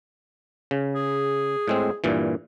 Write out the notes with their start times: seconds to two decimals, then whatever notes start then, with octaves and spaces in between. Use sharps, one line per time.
0.71 C#3
0.95 G#4
1.68 A2 G#3 C4
2.04 G2 A#2 E3